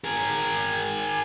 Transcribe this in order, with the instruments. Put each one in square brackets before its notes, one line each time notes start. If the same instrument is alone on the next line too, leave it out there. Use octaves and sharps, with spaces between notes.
[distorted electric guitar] G#4 A#4